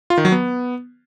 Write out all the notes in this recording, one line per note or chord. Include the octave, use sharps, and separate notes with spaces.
F4
D#3
F#3
B3